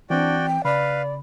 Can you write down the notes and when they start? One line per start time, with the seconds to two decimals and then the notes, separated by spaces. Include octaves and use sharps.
0.10 E3 C4 D4 F#4 D5 G5
0.47 G5
0.65 C#3 B4 D5 F5 B5